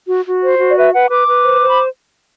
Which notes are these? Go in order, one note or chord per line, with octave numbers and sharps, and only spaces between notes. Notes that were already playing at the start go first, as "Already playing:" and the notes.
F#4
F#4
C5
F#4
D5
B4 E5
B4 F#5
B4 D6
B4
C5
C5
B5